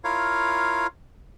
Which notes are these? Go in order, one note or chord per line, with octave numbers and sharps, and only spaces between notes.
E4 F4 A#4 C#5 F5